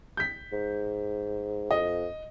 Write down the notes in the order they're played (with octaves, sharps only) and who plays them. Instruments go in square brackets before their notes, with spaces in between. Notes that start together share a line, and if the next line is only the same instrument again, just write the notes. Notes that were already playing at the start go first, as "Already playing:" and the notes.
[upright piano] G6 B6
[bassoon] G#2
[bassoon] F2 [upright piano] D#5